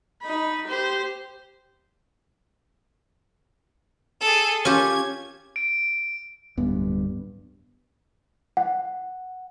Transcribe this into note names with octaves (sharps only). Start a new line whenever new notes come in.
D#4 B5
G4 C5
G#4 A4
C#4 F4 G4 G#6
D7
D1 G2 B3
F#5